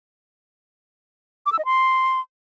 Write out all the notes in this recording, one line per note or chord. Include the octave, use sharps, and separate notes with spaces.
D6
E6
D#5
C6